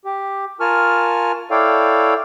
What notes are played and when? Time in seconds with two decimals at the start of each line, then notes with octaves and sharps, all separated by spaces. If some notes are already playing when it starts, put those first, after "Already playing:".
0.05 G4
0.60 F4 A#4 G#5 A5 C#6 F6
1.51 E4 A4 C#5 D5 F5 G5